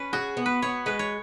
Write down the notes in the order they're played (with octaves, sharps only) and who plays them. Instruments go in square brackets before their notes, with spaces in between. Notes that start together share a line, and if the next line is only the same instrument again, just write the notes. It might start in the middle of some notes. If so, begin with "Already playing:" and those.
Already playing: [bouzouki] C#4 [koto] B4
[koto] F#4 [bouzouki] G#4
[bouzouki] B3
[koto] B4
[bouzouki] B3 [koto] C#5
[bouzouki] G#3 [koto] B4
[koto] C#5